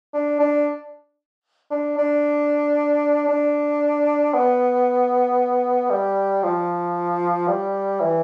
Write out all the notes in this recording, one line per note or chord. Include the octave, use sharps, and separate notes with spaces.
D4
D4
D4
D4
D4
B3
G3
F3
G3
E3